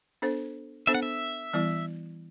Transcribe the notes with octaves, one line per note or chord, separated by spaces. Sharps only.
B3 D4 A4 C5
B3 D4 A4 C5 E5
F#5
E5
E3 G3 B3 E4